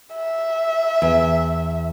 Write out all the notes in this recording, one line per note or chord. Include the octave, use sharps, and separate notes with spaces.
E5
E2